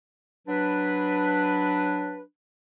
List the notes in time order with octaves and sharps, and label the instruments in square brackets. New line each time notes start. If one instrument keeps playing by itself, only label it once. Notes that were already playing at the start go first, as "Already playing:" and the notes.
[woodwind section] F#3 D4 B4